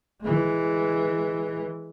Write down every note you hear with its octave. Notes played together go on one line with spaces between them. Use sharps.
E3 G#3